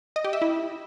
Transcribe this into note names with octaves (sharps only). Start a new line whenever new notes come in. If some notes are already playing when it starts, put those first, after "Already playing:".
D#5
G4
E5
E4